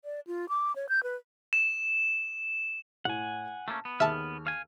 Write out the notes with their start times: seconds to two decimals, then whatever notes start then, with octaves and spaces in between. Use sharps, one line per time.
0.05 D5
0.27 F4
0.49 D6
0.76 C#5
0.89 G6
1.03 B4
1.53 E7
3.05 A2 F#5 G#5
3.68 A3 A#3 C#4 A5
3.85 B3
4.00 D#2 G#4 E5 A5 E6 F6
4.47 F5 G#5